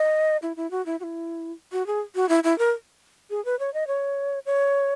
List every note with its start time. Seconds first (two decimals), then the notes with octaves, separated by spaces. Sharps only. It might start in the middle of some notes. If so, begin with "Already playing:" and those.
Already playing: D#5
0.42 E4
0.56 E4
0.71 F#4
0.86 E4
1.00 F#4
1.03 E4
1.72 F#4
1.87 G#4
2.15 F#4
2.29 E4
2.44 E4
2.58 A#4
3.30 G#4
3.45 B4
3.59 C#5
3.74 D#5
3.87 C#5
4.46 C#5